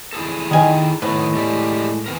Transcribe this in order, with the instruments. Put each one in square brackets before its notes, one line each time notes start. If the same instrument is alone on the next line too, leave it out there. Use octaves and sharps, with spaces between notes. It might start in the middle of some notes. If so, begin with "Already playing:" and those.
[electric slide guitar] E4 G#4 A4
[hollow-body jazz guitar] D#3 G#5
[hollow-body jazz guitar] A2 [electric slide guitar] D#3 B3 B4
[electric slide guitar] G#3 G4 D5
E3 B3 A#4